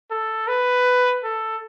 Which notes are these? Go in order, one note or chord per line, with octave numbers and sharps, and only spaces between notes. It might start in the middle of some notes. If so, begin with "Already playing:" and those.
A4
B4
A4